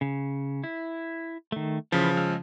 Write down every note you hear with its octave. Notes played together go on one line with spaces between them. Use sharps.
C#3
E4
D#3 A3
C#3 E3 F3 F4 B4
G#3 E6 F6